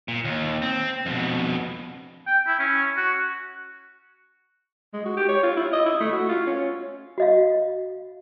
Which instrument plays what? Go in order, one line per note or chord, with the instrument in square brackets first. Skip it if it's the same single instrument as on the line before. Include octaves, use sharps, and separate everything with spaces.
[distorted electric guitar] A#2
D#2
C4
F2 B2
[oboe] G5
E4
C#4
F#4
[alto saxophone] G#3
F#4
G4
C#5
F4
E4
D#5
E4
A3
F#4
F4
C#4
[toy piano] F#4 D#5 F5